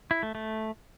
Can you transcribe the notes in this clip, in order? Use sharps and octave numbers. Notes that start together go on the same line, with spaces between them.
E4
A3
A3